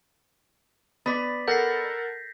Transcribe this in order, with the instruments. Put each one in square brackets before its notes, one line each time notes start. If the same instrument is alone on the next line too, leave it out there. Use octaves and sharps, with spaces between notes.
[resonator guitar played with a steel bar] B3 D5 [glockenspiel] A6 B6
[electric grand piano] A4 A#4 F#5 [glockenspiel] G6 A#6 C7